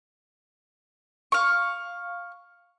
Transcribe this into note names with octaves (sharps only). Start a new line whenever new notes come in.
F5 C#6